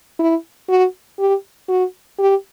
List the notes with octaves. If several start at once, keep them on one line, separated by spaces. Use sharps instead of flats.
E4
F#4
G4
F#4
G4